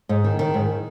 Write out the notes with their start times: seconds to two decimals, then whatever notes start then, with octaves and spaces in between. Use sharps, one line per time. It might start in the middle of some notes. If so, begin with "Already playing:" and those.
0.09 G#2
0.24 D#3
0.39 D#3
0.54 G#2